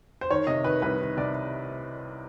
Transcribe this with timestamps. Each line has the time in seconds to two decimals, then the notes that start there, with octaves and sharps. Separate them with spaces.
0.21 C5
0.31 D#3 C#5
0.47 C3 D#5
0.64 D#3 B4
0.82 C2 B4
1.00 D#3
1.17 C3 D5